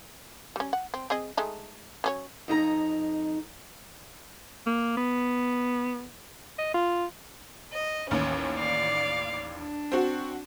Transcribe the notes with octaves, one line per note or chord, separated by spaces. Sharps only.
G3 C#4
F#5
C4
C4 G#4 D#5
G#3 A3 D#4
F#3 C#4 C#5
F2 D#4 F#4 A#5
A#3
B3
D#5
F4
D#5
A1 D#2 C#4
D5 F5 D6
D4
C4 F#4